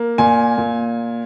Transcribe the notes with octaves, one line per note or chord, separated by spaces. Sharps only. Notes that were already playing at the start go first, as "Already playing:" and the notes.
Already playing: A#3
A#2 G#5
A#2